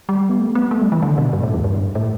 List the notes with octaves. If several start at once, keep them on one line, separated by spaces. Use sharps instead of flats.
G3
B3
A3
B3
A3
G3
E3
D3
B2
G2
A2
E2
G2
A2